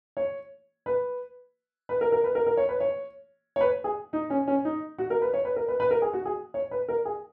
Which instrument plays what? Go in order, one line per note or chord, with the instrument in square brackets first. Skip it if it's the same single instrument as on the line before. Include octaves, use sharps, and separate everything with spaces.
[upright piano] C#5
B4
B4
A#4
A#4
B4
A#4
A#4
C#5
B4
C#5
C#5
B4
G#4
D#4
C#4
C#4
D#4
F#4
A#4
B4
C#5
B4
A#4
B4
B4
A#4
G#4
F#4
G#4
C#5
B4
A#4
G#4